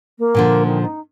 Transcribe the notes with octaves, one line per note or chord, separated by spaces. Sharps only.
A#3
A#2 D3 F3
D#3
D#4